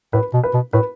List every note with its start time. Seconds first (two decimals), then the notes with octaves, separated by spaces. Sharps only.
0.13 A2 B4
0.34 B2
0.43 B4
0.54 B2
0.73 A2 B4